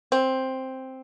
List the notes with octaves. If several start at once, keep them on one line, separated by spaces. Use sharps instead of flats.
C4